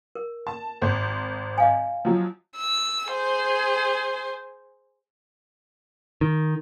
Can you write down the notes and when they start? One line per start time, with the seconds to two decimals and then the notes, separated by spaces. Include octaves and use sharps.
0.15 A#4
0.47 A5
0.81 G#1 C5
1.58 D#5 F5 G#5
2.05 F3 F#3
2.57 E6
3.10 G#4 C5
6.21 D#3